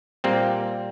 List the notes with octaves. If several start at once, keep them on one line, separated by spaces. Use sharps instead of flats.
A#2 G3 A#3 C4